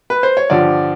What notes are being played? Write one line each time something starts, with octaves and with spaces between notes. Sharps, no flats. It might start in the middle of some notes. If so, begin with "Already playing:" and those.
B4
C5
C#5
G2 D3 F3 D5